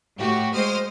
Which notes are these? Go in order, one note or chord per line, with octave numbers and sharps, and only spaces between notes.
A2 F#4 G4
G#3 C5 D#6 F6